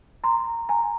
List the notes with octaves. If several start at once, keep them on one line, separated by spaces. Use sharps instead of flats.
A#5 C6
G#5 A#5